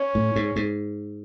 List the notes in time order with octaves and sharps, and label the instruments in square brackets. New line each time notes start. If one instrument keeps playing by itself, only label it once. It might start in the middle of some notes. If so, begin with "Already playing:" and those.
Already playing: [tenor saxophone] C#4
[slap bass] A2
G#2
G#2